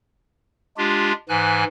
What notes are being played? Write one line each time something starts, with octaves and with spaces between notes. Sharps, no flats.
G#3 D4 F4 G4
G#2 E3 G#5 F#6